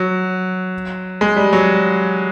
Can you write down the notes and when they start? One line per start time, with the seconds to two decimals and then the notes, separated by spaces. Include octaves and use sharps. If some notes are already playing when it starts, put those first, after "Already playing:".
Already playing: F#3
1.21 G#3
1.37 G3
1.53 F#3